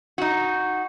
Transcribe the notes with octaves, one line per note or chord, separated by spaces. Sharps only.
D#4 F#4